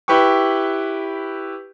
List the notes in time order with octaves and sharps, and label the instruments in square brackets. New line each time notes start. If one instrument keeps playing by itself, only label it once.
[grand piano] E4 G4 B4 G5 C#6